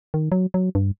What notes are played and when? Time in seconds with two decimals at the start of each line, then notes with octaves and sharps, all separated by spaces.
0.14 D#3
0.32 F#3
0.54 F#3
0.75 G2